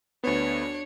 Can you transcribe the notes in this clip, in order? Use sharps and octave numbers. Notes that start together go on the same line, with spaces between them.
D2 B3 D4 C#5